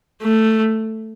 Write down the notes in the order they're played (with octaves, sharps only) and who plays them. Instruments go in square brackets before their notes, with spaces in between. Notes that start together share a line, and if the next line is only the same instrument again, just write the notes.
[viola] A3